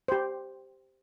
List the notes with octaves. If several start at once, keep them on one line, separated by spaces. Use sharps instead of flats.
G4 C5